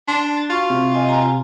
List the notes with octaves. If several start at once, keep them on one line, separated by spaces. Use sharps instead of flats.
D4 C6
A6
F4 F#4 C#6 F6
C3
D#5 G5 G#5
G#5 A#5